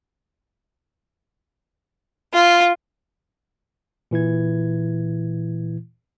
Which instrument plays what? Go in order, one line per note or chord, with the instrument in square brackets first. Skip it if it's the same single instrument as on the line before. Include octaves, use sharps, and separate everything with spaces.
[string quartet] F4
[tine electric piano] A#2 E3 E4 G#6